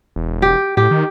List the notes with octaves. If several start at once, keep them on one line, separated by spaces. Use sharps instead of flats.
E1
G4
A2 G4
D#3